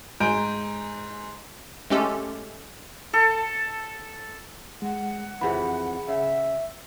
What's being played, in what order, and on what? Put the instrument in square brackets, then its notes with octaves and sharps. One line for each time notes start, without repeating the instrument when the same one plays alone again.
[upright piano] G#2 G#5 A#5 G6 D7
[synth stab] G#3 A3 C#4 G4 A4
[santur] A4
[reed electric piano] G#3 [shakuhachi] F#5
[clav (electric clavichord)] F2 C3 E3 [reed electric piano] G#4 B5
[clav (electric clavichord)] C#3 [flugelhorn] E5